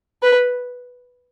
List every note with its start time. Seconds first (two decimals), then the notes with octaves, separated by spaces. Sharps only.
0.22 B4